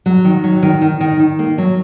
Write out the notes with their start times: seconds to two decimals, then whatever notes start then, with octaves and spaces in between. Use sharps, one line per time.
0.06 F#3
0.24 D#3
0.44 F#3
0.63 D#3
0.81 D#3
1.00 D#3
1.20 D#3
1.39 A#3
1.58 F#3